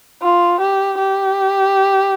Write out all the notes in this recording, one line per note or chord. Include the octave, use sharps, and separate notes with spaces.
F4
G4
G4